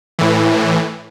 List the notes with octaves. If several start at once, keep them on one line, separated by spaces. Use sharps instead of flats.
A2 E3